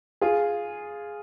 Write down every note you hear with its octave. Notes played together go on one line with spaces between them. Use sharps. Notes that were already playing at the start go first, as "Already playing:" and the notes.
F4 G#4